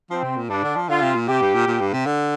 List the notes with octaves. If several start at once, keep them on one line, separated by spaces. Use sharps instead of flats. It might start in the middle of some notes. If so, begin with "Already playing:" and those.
F3 C4
C3
A#2
G2 D4
D3
F3
D3 F4
C3
A#2
C3 G4
G2
A#2
A#2
G2
C3
D3